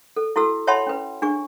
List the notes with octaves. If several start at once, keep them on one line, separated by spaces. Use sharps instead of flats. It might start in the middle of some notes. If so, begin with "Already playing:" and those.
A4
E4 F#4 A4 E6
C#5 E5 F#5 A5 B5 C6
C#4 B4
D4 G#4 C#6